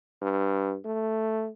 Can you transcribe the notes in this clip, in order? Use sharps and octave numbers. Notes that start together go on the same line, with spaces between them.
G2
A3